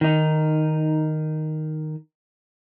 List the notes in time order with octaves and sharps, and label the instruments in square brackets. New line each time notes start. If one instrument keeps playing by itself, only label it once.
[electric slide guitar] D#3 D#4